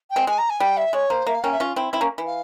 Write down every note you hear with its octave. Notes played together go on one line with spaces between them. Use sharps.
G5
G#3 C4
G#3 G#5
A#5
G#5
G3 G5
E5
G#3 C#5
A#3 C5
A#3 E5
F5
A#3 C#4 G5
E5
C#4 F4
C4 E4
C4 E4
A#3 C#4
E3
F5